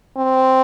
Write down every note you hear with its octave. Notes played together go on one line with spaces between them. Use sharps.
C4